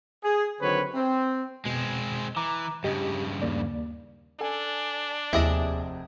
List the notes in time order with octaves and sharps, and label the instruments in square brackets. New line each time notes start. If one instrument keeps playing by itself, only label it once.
[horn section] G#4
D3 D#3 F#3 C4 B4 C#5
C4
[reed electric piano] F2 B2 [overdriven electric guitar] G#3 C4
[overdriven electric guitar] E3 [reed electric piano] A#5 D6
[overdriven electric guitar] G2 C#3 [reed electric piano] G4 D#5
[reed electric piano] D#2 A#3 D5
[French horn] D4 [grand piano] A4 G#5
[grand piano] F1 C3 [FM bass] D#2 [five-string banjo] E4 G#4 D#5